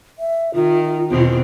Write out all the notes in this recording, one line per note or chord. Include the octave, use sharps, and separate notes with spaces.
E5
D#3 F4
E2 B2 C4